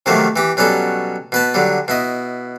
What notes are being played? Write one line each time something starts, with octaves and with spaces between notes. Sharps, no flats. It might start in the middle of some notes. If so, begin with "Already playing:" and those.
C3 D#3 F3 F#3 A3 A#3
E3 G4
B2 F#3 G3 C#4 A4
B2 B4 A5
D3 F#3 G3
B2 E4 D#5